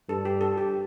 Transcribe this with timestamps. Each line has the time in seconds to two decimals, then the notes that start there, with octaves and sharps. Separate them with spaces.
0.09 G2 A4
0.25 G4
0.41 A4
0.58 G4